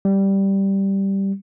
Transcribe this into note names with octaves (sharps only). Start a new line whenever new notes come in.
G3